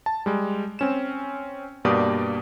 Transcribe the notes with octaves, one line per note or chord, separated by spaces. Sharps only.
A5
G3 G#3
C4 C#4 E7
G2 B2 A#3 G4 D5 D#6